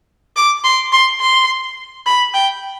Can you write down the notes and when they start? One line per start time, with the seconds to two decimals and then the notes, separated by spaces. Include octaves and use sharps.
0.37 D6
0.64 C6
0.92 C6
1.21 C6
2.06 B5
2.34 G5